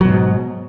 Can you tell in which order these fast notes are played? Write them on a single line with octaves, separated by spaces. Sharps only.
F#3 B2 G#2